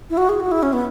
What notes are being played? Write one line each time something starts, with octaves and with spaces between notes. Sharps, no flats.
E4
F#4
G#4
F#4
E4
C#4
B3